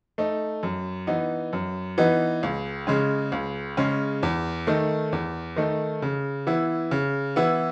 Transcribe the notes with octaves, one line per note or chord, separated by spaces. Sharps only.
A3 D#4
F#2
E3 B3 D#4
F#2
E3 B3 D#4
C#2
C#3 G#3 C#4
C#2
C#3 G#3 C#4
E2
D#3 A3 D#4
E2
D#3 A3 D#4
C#3
E3 B3 E4
C#3
E3 B3 E4